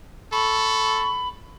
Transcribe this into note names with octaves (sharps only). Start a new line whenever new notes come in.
A4 B5 C#6